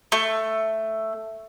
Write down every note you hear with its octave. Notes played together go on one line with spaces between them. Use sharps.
A3